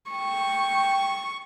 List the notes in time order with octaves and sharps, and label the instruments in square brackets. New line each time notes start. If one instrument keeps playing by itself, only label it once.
[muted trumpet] G5 [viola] C#6